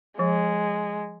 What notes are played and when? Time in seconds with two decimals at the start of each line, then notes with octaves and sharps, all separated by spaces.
0.19 F3 G#3